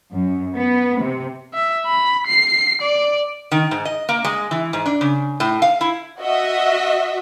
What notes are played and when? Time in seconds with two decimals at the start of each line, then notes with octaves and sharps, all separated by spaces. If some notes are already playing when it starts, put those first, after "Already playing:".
0.13 F#2
0.55 B3
1.00 C3
1.54 E5
1.87 B5
2.27 C7
2.82 D5
3.51 D#3
3.71 G#2
3.85 D#5
4.09 A#3
4.25 G#3
4.51 E3
4.73 G#2
4.86 D4
5.01 C#3
5.40 A2
5.62 F5
5.81 E4
6.20 F#4 D#5 E5